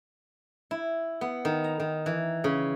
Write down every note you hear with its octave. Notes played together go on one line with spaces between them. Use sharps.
E4
B3
D#3
A#5
D#3
E3
C#3